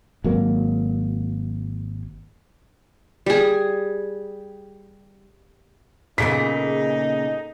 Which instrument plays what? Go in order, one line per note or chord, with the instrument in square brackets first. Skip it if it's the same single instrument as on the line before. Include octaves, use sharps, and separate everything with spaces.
[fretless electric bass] G#1 F#3 A#3
[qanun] G3 G#4
[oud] A#2 C#3 B3 [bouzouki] A#3 G#4 A4 [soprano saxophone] D#4 [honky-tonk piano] B6